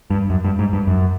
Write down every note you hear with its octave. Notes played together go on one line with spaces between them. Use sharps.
G2
F#2
G2
G#2
G2
F#2